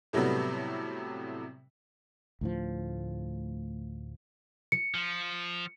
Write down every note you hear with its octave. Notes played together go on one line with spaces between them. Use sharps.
A2 C3 F#3 G3 A3 B3
D2 A2 F3
C#7
F3